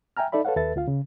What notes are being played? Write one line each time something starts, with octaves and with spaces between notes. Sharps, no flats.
E5 G5 G#5 A#5 F6
D#4 A4 D5 E5 B5
A4 B4 C#5 F5 F#5
D#2 A4 B4 E5 A6
D2 F4 F5
C#3